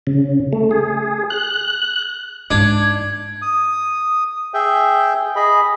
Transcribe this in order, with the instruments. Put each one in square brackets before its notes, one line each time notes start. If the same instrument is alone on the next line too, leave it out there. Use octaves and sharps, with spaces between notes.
[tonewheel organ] C#3
A3
G#4
F#6
[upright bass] G#2 D#4 [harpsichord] D4 [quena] G#6
[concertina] D#6
G#4 E5 G5
G#4 D#5 B5